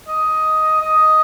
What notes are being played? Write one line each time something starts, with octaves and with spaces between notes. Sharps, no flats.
D#5
D#5